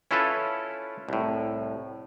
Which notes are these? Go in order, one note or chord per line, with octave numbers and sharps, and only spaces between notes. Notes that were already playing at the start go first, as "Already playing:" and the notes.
C#4 E4 F4 A4 B4 C#5
C2 A2